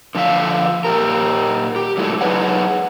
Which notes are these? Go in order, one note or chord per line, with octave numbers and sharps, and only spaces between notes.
D3 F3 F#3 E5 F5
A#2 G4 A#4
G4
F#3 G#3 A3 E4
F#3 D#4 G#4 B4 C#5 F#5